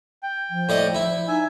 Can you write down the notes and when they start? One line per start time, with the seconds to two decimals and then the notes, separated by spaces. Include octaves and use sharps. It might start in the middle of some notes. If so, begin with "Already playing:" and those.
0.23 G5
0.50 F3
0.69 A2 D5 D#5
0.95 E4
1.28 D#4 E5 G#5